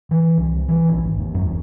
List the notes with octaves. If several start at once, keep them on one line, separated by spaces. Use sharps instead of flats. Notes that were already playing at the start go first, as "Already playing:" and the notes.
E3
C2
E3
A#1
G#1
D#2
F#2
E1